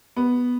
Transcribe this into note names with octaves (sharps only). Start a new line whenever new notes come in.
B3